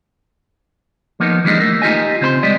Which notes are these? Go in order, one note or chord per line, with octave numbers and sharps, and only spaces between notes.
F3 A#3 B3 D#4
E3 F3 G3 G#3 D4 D#4
A3 A#3
D#4 F4 G4 D#5 G#5
C#3 C4 C5 B5 C6
G3 G#3 G4 D5 D#5